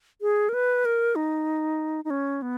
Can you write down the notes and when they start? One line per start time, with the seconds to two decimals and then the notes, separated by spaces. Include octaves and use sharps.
0.21 G#4
0.49 A#4
0.54 B4
0.85 A#4
1.16 D#4
2.05 D#4
2.10 C#4
2.42 B3